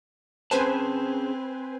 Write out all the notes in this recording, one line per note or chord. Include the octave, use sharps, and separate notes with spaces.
C4 C#4 G#4 B4 C5 G#5 A5